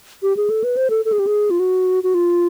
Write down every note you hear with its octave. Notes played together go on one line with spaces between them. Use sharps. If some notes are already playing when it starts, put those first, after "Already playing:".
G4
G#4
A4
B4
C5
A4
A4
G#4
G4
G#4
F4
F#4
F#4
F4